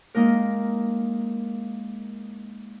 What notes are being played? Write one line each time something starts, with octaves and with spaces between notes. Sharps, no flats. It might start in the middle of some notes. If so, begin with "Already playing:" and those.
G#3 A#3 D#4 A#4